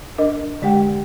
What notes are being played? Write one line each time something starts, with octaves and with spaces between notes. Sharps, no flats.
D4 A#4 D#5
D3 G#3 G4 F#5 G5